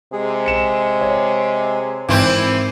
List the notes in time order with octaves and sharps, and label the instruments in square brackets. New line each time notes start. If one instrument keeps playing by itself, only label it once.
[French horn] C3 [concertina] G#3 G#4
[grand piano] C#7 E7
C#5
[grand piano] G#1 [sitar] E3 C4 [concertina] D6